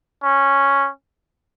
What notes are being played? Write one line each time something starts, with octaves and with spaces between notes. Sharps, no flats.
C#4